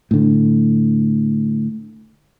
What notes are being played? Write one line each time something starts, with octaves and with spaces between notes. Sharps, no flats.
A2 D3